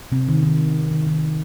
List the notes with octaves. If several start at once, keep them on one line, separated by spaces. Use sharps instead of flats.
C3 C4
D#3
D#3
D#3
D#3